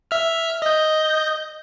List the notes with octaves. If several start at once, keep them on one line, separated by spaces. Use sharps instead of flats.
E5 F6
D#5 G6